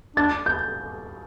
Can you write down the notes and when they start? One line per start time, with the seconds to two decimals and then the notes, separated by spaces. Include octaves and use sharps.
0.16 D4 A6
0.46 G6